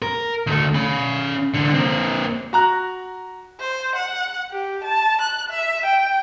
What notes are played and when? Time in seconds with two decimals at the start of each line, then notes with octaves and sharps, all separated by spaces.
0.02 A#4
0.47 D2 A3
0.74 C#4 B5
1.54 C2 D3
1.74 A#3 C4
2.53 F#4 A#5 F#6
3.60 C5
3.96 F#5
4.51 G4
4.84 A5
5.22 F#6
5.50 E5
5.86 G5